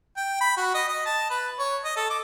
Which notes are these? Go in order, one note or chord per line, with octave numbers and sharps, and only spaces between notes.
G5
B5
F#4
D#5
D#5
A5
B4
C#5
D#5
A4
D6